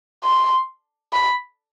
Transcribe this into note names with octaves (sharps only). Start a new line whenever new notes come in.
C6
B5